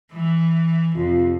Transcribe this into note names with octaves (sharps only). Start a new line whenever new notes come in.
E3
F2 C3 F4